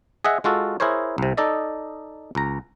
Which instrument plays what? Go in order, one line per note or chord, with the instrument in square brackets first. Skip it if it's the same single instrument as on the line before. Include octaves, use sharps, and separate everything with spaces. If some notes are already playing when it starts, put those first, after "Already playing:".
[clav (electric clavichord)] G#4 D#5 E5 F#5
G#3 F4 F#4 A4
E4 G#4 A#4 C5 C#5
C2 C3
D#4 A4 D5 D#5
C#2 A#5